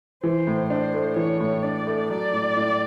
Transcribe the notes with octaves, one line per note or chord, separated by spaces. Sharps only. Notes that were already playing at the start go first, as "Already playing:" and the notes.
E3 C5
A2
D4 C5
A3
E3 C#5
A2
D4 D5
A3
F#3 D5
A2
A2